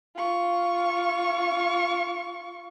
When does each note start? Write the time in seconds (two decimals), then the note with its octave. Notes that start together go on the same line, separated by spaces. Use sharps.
0.16 F4 C#6